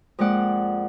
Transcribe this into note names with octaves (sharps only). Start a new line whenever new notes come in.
F2 G#3 A#3 D5 F#5